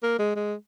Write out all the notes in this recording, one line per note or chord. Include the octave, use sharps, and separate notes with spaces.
A#3
G#3
G#3